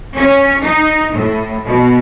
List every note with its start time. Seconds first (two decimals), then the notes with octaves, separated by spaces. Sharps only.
0.16 C#4
0.62 D#4
1.13 A2
1.66 B2